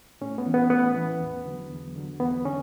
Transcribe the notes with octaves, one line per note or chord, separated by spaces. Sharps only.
A2 C#4
B3
E3
B3
A2 B3
E3
E2
D3 F#3
E2
D3 F#3
E2 B3
D3 C#4